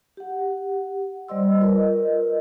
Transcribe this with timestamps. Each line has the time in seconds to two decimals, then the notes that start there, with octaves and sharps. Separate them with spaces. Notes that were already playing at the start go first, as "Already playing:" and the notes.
0.17 G4 F#5
1.29 G3 C5 D5 D#5 C6 E6
1.61 F4 A#4 B4 D#5